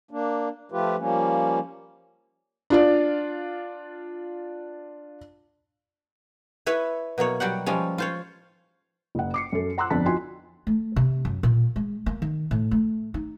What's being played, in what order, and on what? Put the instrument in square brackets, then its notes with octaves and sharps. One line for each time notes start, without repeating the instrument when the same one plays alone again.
[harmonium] A#3 D4
F3 A3 F4 G4 B4
F3 G3 A#3 C#4
[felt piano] D4 F4 D5
[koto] E4 B4 C#5 E5
B2 F#3 A#3 C#5
F#3 G3 G4 F#5
F3 G3 G#3 C#4
F4 C5 C#5
[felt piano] F#1 F#5
D6 C7 C#7
F#2 A4
F#5 A#5 C6 D6 E6 F#6
G1 F2 D4 A5 B6
D#4 F4 F#4 G#5 C6
[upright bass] A3
C3
F#2
A#2
G#3
A#3
D#3
A2
A3
D#4